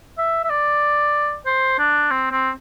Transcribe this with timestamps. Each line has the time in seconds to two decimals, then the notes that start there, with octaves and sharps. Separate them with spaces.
0.18 E5
0.44 E5
0.50 D5
1.46 C5
1.78 D4
2.10 C4
2.31 C4